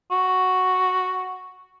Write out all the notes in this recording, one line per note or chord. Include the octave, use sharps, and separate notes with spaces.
F#4